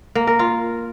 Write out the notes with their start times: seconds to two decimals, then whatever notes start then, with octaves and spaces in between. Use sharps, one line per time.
0.15 A#3
0.27 A#4
0.39 F4